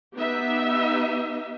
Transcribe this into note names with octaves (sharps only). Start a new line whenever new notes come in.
B3 D#4 G4 E5